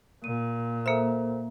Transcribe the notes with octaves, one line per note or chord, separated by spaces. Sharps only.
A#2 D#7
A#3 A4 A#4 C5 E5